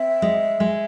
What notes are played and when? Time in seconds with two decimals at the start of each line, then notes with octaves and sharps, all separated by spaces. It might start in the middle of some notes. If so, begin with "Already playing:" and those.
Already playing: C4 E5
0.22 G#3
0.60 G#3